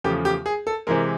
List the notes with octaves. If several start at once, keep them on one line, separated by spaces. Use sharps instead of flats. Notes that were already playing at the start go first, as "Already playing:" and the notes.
E2 C#3 F3 A3 G4
G4
G#4
A4
C3 E3 G#3 A#4